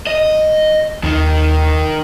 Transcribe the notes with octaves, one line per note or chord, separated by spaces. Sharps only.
D#5
D#2 D#3 D#4